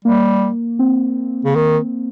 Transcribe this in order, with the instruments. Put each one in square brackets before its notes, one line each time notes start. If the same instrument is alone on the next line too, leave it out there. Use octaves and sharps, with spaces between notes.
[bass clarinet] G3 [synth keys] A#3
[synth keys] C4
[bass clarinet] C#3
D#3